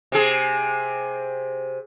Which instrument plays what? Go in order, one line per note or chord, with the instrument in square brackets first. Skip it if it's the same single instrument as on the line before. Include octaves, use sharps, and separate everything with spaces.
[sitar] C3 G#4